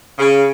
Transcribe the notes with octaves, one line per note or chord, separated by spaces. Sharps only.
C#3